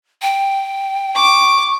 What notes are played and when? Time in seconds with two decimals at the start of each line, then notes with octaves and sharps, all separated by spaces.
0.22 G5
1.15 C#6 D6